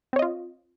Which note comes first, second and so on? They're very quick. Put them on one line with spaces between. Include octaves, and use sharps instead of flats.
C4 C#5 D#5 F4